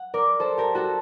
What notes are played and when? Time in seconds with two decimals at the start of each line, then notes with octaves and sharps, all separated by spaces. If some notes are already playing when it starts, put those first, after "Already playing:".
Already playing: F#5
0.14 A#4 D5
0.40 A4 C5
0.58 G4 A#4
0.75 F#4 A4